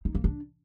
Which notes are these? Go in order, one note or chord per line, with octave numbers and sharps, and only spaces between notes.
D#4
A#3
D4